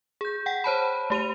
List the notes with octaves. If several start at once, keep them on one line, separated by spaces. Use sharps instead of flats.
G#4 G6
F#5 G5 B6
C5 C#5 A5 B5
A3 G4 D#7 F7